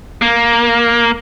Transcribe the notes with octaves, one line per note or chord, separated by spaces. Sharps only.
A#3